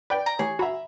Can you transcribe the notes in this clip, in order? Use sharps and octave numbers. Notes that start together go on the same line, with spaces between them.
B4 D5 G5 B5
A#5
E3 A3 G4 G#4 C#5
F#4 E5 A#5 B5